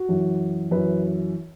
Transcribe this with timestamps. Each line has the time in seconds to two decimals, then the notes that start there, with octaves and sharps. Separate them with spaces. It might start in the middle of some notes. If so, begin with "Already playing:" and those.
Already playing: F#4
0.09 F#2 E3
0.71 F#2 E3 B4